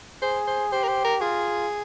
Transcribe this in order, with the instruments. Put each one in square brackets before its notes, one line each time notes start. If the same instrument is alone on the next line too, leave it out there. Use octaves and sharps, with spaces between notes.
[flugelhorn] G#4 [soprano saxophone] C5
[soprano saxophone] C5
[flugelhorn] G4 [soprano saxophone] C5
[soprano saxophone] A#4
C5
A#4
[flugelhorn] F4 [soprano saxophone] G#4